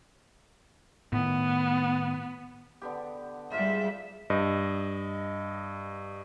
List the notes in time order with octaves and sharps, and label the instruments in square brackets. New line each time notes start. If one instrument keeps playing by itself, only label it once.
[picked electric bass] A2 D#3 [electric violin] B3
[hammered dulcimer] D3 B3 G4
[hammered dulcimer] G#2 F4 [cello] G3 E5
[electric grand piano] G2 D#5